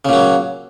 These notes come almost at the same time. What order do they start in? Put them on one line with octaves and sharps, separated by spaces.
C#3 A#2 F#3